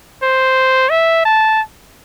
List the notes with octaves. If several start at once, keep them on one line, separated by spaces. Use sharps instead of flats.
C5
E5
A5